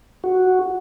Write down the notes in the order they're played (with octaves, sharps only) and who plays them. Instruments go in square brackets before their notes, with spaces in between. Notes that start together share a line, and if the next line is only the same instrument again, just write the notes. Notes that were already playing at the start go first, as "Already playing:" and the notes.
[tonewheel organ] F#4